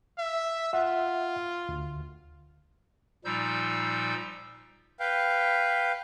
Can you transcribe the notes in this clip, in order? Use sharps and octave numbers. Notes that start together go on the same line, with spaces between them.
E5
F4 E5 F#5
D2
A#2 F3 G3 D#4 E6 G6
B4 F5 G5